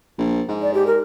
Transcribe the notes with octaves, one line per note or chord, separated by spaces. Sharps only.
A#1
G#2
D5
G4
A#4